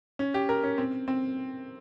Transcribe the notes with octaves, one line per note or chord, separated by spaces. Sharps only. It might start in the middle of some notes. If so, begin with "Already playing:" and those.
C#4
G4
A#4
C#4
C4
C4